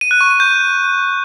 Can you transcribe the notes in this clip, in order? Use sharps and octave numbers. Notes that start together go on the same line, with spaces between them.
D#7
F#6
C#6
D#7
G6